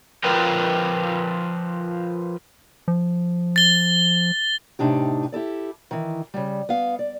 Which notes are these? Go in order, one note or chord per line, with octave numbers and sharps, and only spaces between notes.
F3 F4 A#4 B4 G5
F3
A6 G7
A2 C3 D4 D#4 G4
E4 G4 A4 D5
D#3 E3
C#3 G3
B3 F5
D5